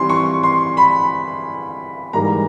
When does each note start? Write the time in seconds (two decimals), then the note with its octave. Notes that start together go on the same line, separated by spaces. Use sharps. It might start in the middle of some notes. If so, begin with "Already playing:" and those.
Already playing: E3 G3 C4 C6
0.09 C#6
0.43 C6
0.77 B5
2.13 G#2 E3 G3 A#3 A#5